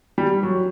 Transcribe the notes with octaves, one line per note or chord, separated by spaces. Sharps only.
G3
F#3